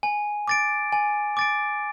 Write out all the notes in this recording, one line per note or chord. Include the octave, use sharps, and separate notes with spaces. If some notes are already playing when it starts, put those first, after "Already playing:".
G#5
D6 A6 D7
G#5
D6 A6 D7